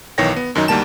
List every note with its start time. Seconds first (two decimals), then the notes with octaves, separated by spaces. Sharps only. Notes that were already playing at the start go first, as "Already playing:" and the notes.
0.18 B1 D#3 E3 C#5 G5 A#6
0.36 B3
0.55 F#2 D#3 F#3 D#4
0.68 D2 D#3 G3 A#3 A5 E7